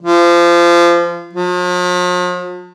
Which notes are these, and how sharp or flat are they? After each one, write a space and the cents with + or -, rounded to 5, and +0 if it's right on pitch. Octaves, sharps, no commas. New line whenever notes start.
F3 -25
F3 +45